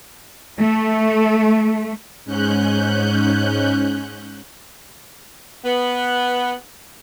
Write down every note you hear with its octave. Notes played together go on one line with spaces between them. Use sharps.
A3
G#2 C#4 F#6 G6
B3